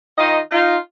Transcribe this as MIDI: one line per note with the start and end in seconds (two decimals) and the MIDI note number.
0.18 0.40 51
0.18 0.40 63
0.18 0.40 65
0.18 0.40 75
0.52 0.76 63
0.52 0.76 65